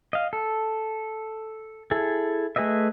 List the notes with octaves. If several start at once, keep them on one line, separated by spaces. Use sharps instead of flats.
D#5 F5
A4
E4 G#4 A4
A3 G#4 B4 D#5 E5